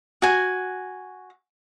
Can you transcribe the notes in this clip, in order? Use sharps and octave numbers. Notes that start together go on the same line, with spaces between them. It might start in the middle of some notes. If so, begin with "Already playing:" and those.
F#4 G#5